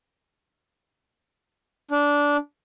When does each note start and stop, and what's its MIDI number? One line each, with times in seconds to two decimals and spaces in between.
1.91 2.37 62